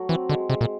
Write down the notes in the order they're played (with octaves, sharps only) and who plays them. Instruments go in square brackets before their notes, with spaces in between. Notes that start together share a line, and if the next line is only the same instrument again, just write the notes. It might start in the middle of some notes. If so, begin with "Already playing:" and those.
Already playing: [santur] F#3 A3
[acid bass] E3 [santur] C4
[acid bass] D3 [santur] G#3
[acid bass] C3 [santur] G#3
[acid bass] A#2